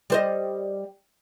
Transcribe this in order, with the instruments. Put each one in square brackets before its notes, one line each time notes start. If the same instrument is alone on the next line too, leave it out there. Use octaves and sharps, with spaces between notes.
[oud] G3 C5 D#5